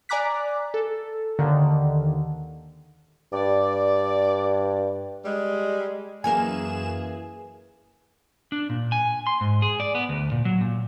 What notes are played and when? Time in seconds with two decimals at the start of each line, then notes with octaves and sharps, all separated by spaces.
0.09 D5 G#5 A#5 D6 F#6 B6
0.74 A4
1.38 D#2 D3 D#3
3.33 G2 D5
5.24 G3 G#3
6.24 F#2 E3 A#3 G#4 A#4 G#5 E7
8.52 D4
8.70 A#2
8.92 G#5
9.27 C6
9.41 G#2
9.62 G#4
9.80 D5
9.95 B3
10.09 D2
10.31 A#2
10.45 F#3
10.61 A#2